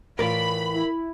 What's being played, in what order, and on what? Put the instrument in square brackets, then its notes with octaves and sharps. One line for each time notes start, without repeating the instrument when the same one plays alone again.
[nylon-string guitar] A2 E3 F4 [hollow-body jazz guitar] A#4 D5 [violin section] B5
[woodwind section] E4